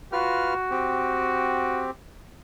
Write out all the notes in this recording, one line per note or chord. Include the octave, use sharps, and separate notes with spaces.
F4 F#4 B4 F6
C4 G4